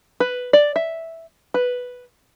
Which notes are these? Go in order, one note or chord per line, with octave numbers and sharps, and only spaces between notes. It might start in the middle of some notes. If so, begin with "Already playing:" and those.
B4
D5
E5
B4